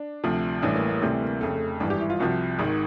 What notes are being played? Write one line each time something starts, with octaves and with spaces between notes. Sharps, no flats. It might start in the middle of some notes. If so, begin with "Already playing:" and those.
Already playing: D4
D2 C3 F3
A1 A2 E3 G3 D4
A#3
A#3
D2 C3 E3 G3 A3
A#3
F1 F2 C#3 A3
G#1 G2 E3 D4
G4
E4
F4
C2 C3 F3 F#4
G#1 G#2 D#3